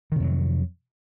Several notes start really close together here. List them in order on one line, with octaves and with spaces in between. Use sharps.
D#3 C3 F2 F#3